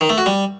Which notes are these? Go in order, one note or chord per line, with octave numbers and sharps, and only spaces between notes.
D#3
A3
F#4
G3